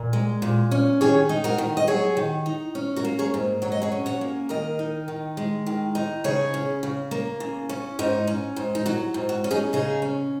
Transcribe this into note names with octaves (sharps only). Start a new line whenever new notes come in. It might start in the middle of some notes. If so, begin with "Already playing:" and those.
Already playing: A#2
G#3
A#2
C#4
D#3 G#4 C#5
D#4
F#4 A#4
D#3
D#5
F#3 G#4 C#5
D#3
D#4
C#4
F#4 A#4
A#3
G#4 C#5
G#2
F#3 C#5
D#5
G#4 C#5
C#4
C#5 F#5
A#3
D#3 A#4 D#5
D#4
D#3
G#3
D#3
D#4
C#3 G#4 C#5
C#4
C#3
A#3
C#3
C#4
G#2 D#4
C#4
G#2
D#4
F#3 F#4
G#2
F#4
C#4
D#4 G#4
C#3 D#4 G#4
C#4